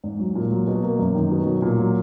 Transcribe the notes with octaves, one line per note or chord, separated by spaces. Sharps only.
G#2
F#3
A#2
F#3
B2
A#3
F#2
D#3
B2
F#3
A#2
F#3